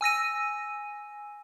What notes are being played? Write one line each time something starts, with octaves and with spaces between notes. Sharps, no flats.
G#5 E6 A#6 D#7